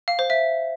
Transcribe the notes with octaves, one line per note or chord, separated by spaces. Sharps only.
F5
C5
E5